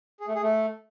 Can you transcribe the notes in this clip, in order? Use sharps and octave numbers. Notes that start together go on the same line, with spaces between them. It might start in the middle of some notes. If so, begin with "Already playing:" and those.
G#4
A3
G#4
A3